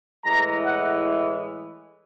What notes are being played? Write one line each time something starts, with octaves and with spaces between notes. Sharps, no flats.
A2 E3 G#3 A#5
F#5